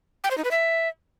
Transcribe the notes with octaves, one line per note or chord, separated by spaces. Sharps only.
G5
C5
D#4
B4
E5